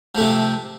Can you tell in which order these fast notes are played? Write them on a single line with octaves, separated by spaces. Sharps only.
F3 A3 C3